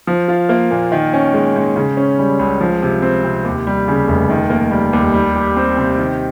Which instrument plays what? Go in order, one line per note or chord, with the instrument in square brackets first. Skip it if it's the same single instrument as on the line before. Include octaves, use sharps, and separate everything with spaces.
[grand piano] F3
F4
A#3
A#2
D#3
C#4
G#3
G#2
C#3
C#4
G3
C#2
F3
C3
C4
C3
D#2
G3
C#3
F1
D#3
A#3
G3
D#2
G3
G4
C4
C3
D#3